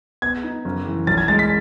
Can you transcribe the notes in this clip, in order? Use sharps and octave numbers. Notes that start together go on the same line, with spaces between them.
B3 G#6
D#4
F#1
E3
B1 A6
G#6
G#3 A6
B6